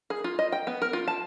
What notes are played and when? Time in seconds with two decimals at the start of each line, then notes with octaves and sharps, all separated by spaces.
0.10 G#4
0.24 F4
0.39 D#5
0.52 G5
0.67 B3
0.82 A#4
0.93 F4
1.08 A5